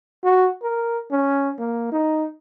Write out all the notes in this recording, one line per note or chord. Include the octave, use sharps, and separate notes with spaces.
F#4
A#4
C#4
A#3
D#4